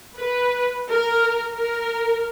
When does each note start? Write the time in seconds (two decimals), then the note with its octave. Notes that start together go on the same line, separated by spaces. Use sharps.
0.18 B4
0.90 A#4
1.53 A#4